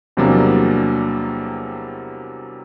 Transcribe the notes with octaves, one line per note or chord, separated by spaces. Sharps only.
E2 C3 F#3 G3 A#3 D4